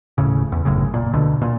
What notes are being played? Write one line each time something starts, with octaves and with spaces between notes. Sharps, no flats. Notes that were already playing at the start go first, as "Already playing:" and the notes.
D#1 A2 C#3
E2
G1 F#2 A2 C#3
A#2
D2 B2 D3
A#2